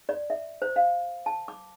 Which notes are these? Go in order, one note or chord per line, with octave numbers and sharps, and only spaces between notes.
D5
E5
C5
F5
A5
D6